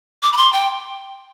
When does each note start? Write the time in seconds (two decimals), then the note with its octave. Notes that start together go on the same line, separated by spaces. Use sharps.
0.23 D6
0.33 B5
0.37 C6
0.53 G5